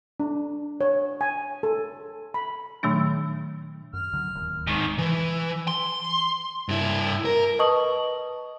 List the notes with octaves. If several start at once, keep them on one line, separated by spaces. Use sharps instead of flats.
D4
C#5
G#5
A4
B5
A#2 D#3 F#3 A3 D4
F#2 F6
C#2 D3 F#3
D1 D#2 F#3
G#2 D#3
E3
C6
G2 E4
A#4
B4 D#5 A5 C#6 D#6 F#7